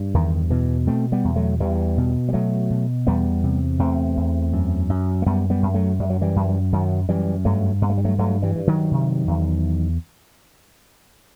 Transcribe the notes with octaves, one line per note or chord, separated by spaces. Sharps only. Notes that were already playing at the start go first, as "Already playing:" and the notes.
Already playing: G2
E2 D#3
B2 E3
B2 A3 C4
G3 B3
E2
F#3 A3
E2 E3 G3
B2
G3
B2 F#3 A3
B2
E2 G3 B3
C3
E2 A3 C4
E2
F#2
F#2
A3
F#2 G3 B3
G3 B3
F#2
F#3 A3
F#2 G3
F#3
E3 G3
F#2
F#2 D#3 F#3
F#2 E3 G3
G2 F#3 A3
G2 B3
A3
G3
F#3 A3
G2 F#3 A3
E3 G3
G2
D#3 F#3
C3
E2